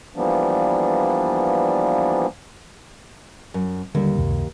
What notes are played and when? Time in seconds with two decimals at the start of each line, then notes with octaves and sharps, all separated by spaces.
0.15 E3 F3 G3 A#3 B3 D4
3.54 F#2
3.95 D#2 D3 G3
4.15 C#2 F#2 C3